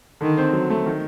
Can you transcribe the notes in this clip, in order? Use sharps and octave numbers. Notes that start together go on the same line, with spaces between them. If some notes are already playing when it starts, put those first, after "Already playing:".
D3 D#3
C4
F#3
A3
D#3